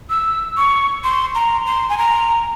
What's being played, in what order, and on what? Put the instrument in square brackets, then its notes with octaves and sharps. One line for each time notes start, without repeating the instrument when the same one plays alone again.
[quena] E6
C#6
C6
A#5
C6
G#5
A#5